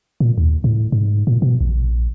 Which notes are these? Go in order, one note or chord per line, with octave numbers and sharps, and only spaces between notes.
A#2
D#2
A2
G#2
A#2
B2
A#1